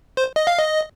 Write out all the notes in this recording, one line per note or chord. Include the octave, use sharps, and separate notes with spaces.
C5
D#5
F5
D#5